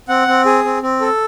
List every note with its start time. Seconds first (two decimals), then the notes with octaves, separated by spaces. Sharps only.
0.09 C4 F#5
0.28 C4
0.46 G#4
0.64 C4
0.82 C4
1.01 A4